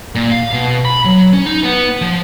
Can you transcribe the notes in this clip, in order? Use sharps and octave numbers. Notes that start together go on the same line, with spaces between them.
A#2
F5
B2
B5
F#3
C#4
D#4
B3
F3